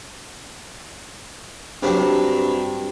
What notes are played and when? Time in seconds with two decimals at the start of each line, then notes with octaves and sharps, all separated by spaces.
1.83 G2 C3 F#3 C4